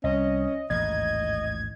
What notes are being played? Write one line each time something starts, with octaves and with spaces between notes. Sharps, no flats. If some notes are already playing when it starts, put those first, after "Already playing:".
C2 C#4 D#5
A1 D#2 G#2 D#5 G#6